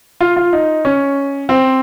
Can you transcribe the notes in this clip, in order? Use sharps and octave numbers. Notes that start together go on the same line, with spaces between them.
F4
F4
D#4
C#4
C4